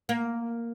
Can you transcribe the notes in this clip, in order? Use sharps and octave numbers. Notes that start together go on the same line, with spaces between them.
A#3